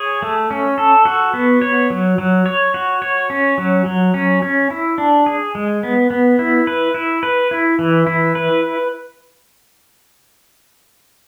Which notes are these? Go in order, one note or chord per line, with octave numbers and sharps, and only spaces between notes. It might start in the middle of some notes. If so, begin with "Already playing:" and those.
Already playing: G#4 C#5
A3
C#4
A4
F#4
B3
C#5
F#3
F#3
C#5
F#4
C#5
C#4
F#3
F#3
C#4
C#4
E4
D4
G#4
G#3
B3
B3
E4
B4
E4
B4
E4
E3
E4
B4